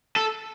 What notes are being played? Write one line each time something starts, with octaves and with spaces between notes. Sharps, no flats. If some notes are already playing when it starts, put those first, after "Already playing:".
A4